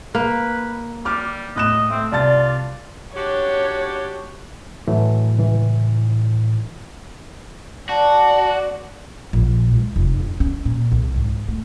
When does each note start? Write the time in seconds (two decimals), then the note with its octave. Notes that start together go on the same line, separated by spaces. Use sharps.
0.15 A#3 B4
1.05 G3 D6 F6
1.56 A2 D#5 F#6 E7
1.91 A3 C4
2.12 C2 F4 D5 A5 A6
3.16 D4 F#4 G4 C#5
4.88 A2 E3 F#3 A3
5.38 C#2 E3
7.89 F#4 D5 A5
9.33 A#1
9.73 C#2
9.96 F1
10.20 G1
10.40 C#4
10.65 A#2
10.92 C2
11.16 G#2
11.48 A3